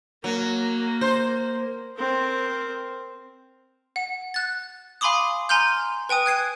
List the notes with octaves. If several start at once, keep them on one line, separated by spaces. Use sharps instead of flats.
F#3 A#3
C5
C4 A#4
F#5
F#6 A6
F5 G#5 B5 C6 D6 D#6
G#5 A#5 C6 F6 G6
B4 G5 G#5 D#6
F#6 G#6 C7 D#7